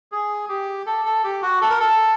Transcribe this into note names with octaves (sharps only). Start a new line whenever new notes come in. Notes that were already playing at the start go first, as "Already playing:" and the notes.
G#4
G4
A4
A4
G4
F#4
A4
A#4
A4